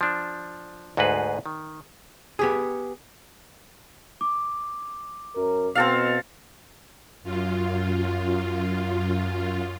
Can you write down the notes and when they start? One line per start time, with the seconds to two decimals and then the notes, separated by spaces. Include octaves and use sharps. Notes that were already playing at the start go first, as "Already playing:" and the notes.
0.01 F3 D4
0.97 D2 G#2 F#4 G#4 B4 C5
1.46 D#3
2.39 B3 G4 G#4
4.21 D6
5.36 F#2 A#4
5.75 B2 C4 A4 F5
7.23 F#2 F4